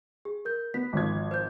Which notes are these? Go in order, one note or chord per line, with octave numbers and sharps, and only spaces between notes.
G#4
A#4 G6
B3 B6
G#1 F3 G#6
C5 G6